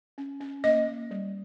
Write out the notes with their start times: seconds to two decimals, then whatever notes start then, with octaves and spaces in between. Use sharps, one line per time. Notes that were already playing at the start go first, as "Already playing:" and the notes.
0.18 C#4
0.40 C#4
0.64 A#3 D#5
0.88 A#3
1.11 G3